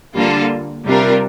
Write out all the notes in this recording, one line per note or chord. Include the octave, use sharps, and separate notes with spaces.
D3 G3 A#3 F4 A4
C3 G3 D4 F4 A#4